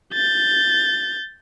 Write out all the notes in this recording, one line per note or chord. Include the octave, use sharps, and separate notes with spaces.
G6 A6